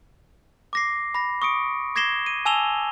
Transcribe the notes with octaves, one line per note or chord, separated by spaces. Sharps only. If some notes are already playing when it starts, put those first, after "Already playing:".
D6 A#6 C7
B5 A#6
C#6 D#6 C#7 D7
D6 G#6 A#6 C7 E7 G7
D#7
G#5 A5 E6 E7 F7 G7